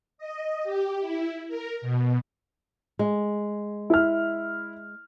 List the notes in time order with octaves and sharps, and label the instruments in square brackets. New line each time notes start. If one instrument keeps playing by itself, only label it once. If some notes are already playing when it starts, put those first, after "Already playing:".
[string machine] D#5
G4
E4
A#4
B2
[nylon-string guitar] G#3
[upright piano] E4 F6